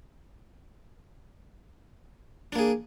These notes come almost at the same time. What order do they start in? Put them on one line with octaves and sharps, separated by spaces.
D4 A#3 G#4